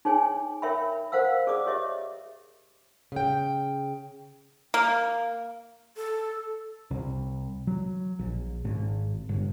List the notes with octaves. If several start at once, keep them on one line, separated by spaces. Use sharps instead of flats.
D#4 G#4 C#5 G5 G#5
A#4 C#5 E5 G5 B5
A#4 C5 F5 F#5 E6
G#4 D5 D6 D#6
G4 C#5 D#5 E5 D6
C#3 G5
A#3
A4
C2
F#3
A#1
G#1
G1